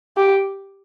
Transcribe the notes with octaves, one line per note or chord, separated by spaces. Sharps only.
G4